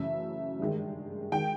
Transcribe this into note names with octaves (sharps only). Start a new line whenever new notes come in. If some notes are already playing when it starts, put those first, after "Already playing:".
Already playing: F#2 C#3 E3 A3 E5
G2 D#3 G#3
D#3 G#3 G5